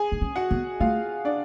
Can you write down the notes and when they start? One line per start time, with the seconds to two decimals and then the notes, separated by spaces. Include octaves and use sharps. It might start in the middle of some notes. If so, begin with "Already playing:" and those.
Already playing: G#4 G#5
0.12 D4
0.21 C#4
0.36 F#4 F#5
0.51 B3
0.80 A3 F4 F5
1.25 D4 D5